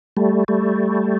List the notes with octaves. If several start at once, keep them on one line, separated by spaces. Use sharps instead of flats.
G3 A3
G3 A3